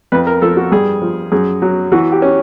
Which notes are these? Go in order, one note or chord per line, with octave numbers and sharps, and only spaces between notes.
F2 B4
A#4
F3 A4
F#4
G2 G#4
F3
F#2 G#4
F#3
E3 F#4
G4
C#4